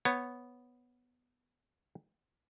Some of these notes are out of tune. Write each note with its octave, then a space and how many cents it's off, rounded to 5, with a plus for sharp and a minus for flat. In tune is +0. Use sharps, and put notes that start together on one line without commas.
B3 +0 C#5 -10